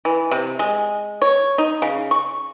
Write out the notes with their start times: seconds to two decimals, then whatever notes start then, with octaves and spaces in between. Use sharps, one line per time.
0.05 E3
0.31 C3
0.59 G#3
1.22 C#5
1.58 D#4
1.82 C#3
2.11 C#6